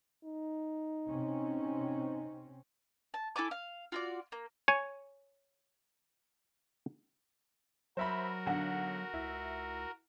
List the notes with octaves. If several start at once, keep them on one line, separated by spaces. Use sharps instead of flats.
D#4
C3 C4 C#4
A5
E4 A4 G#5 D6
F5
F4 F#4 D5
A#3
C#5 G#5
F#3 F#4 A#4 C5 E5 B5
B1 D3 F#5
C#2 E4